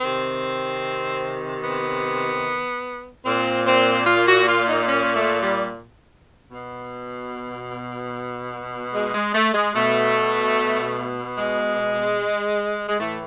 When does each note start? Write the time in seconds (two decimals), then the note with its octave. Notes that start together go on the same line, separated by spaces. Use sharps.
0.01 C3 D#3 C4
1.64 B3
3.25 A#2 C4
3.67 C4
4.07 F4
4.27 F#4
4.48 F4
4.68 D#4
4.88 C#4
5.16 A3
5.43 G3
6.51 B2
8.94 G#3
9.15 G#3
9.34 A3
9.54 G#3
9.75 B2 A3
11.37 G#3
12.89 G#3
13.00 A2 E3 A3